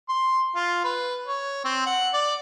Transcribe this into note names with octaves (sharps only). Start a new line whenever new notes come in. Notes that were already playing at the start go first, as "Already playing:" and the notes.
C6
F4
B4
C#5
C4
F#5
D5